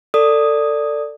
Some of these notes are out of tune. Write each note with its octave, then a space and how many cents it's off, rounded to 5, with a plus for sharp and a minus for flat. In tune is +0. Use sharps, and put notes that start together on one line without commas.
A4 +25 D5 +0 D#6 +0